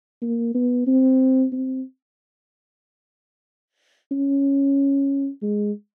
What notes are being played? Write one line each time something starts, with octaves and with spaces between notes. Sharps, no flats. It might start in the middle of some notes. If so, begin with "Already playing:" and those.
A#3
B3
C4
C4
C#4
G#3